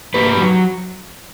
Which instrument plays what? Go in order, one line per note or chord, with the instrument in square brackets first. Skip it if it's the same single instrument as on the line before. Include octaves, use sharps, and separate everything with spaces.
[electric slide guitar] A#3 G4 B4
F#3